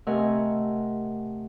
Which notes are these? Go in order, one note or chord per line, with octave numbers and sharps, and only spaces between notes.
C3 A3 A#4 D#5 F#5 G#5